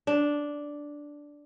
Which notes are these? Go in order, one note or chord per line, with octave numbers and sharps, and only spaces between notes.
D4